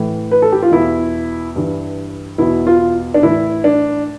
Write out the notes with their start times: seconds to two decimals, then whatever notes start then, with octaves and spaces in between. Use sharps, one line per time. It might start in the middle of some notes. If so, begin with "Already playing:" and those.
Already playing: A2 E3
0.31 B4
0.42 A4
0.52 G4
0.62 F4
0.71 E2 B2 E4
1.56 G2 E3
2.38 E2 B2 E4
2.67 F4
3.14 D4
3.22 A2 E3 E4
3.64 D4